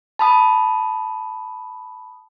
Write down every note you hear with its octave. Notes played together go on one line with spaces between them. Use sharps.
A5 B5 D#6